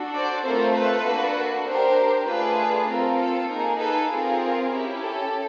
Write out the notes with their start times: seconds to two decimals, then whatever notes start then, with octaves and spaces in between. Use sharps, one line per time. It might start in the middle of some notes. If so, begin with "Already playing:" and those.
Already playing: D4 F#4 A4
0.15 C5 D5
0.45 A3 C4 F4 A4 A#4 C5
0.76 A4 B4
1.06 A#3 D4 F#4
1.66 D4 G4 A#4 C5
2.27 A3 D4 F4 G#4 A4 B4
2.88 C4 F4 A4 A#4
3.18 A4
3.49 A#3 D#4 G#4 A#4
3.79 A4 B4
4.10 C4 F4 G#4 A#4
4.71 C#4 E4 G4
5.02 A4